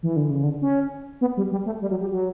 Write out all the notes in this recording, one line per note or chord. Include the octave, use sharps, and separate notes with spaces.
E3
D3
C#3
D3
C#4
B3
G3
G3
A3
G3
F#3
G3
F#3